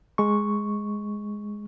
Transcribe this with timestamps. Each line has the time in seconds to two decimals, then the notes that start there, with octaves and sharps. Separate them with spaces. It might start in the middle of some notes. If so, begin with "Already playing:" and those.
0.18 G#3 C#6